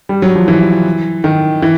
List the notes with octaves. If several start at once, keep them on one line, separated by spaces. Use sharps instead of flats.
G3
F#3
F3
E3
D#3
E3